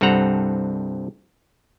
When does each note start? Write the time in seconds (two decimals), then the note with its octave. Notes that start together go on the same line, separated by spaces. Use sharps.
0.01 C2 G2 C4 A4 F#5 A#5